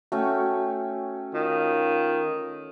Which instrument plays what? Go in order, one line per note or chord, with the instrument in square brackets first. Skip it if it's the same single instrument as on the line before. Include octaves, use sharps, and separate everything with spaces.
[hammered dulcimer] A3 C#4 [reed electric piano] F#4 G5
[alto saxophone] D#3 [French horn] F4